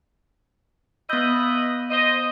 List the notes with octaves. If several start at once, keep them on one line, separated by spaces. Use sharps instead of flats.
B3 E4 B4 D#5 G6
C5 D#5